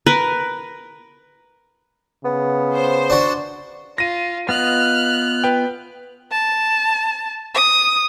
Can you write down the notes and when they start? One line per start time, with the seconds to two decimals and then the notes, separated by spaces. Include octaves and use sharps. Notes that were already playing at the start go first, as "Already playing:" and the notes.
0.06 A#4 B4
2.25 C#3 B3
2.74 C5
3.10 D4 F#4
3.98 F4 A#6 D#7
4.49 B3 F4 D#5 F6 F#6
5.44 B4 G5
6.31 A5
7.54 D#6